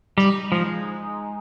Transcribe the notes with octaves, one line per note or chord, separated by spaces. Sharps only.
G3 D#4
F3 G#3